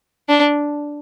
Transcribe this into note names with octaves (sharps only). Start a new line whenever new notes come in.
D4